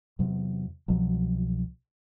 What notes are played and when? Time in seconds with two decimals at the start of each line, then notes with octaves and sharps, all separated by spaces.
0.19 E2 C3 F#3
0.88 C2 B2 F3 F#3